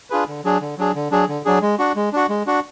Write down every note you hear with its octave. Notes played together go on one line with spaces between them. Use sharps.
D4 F4 G#4 B4
D3
F#3 D4 G#4
D3
F#3 D4 G#4
D3
F#3 D4 G#4
D3
F#3 D4 G#4
G#3
D4 F#4
G#3
D4 F#4
G#3
D4 F#4